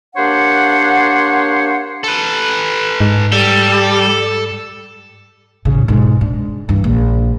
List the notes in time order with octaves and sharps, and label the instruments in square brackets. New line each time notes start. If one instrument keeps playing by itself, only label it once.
[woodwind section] A#3 D4 G4 C5 C#5 F#5
[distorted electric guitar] A4 B4
[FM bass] G#2
[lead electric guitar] G3 [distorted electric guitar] A4
[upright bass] A1 C#3
G#2 B2
D4
G2 E3
A#1